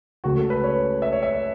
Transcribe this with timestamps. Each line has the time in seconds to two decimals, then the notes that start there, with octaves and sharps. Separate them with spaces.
0.24 C#2 C#3 A3 F#4
0.38 A4
0.50 B4
0.64 C#5
1.02 E5
1.12 C#5
1.23 E5